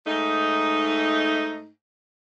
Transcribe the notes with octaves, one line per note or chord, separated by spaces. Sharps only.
G#2 A3 D#4